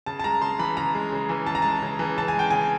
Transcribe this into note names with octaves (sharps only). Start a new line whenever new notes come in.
C#3 A5
A5
G#3 A#5
C#3 C6
E3 B5
C#3 A#5
G#3
C#3
E3
C#3 A5
A#5
G#3 A5
C#3
E3
C#3 A5
G#5
G#3 G5
C#3 G#5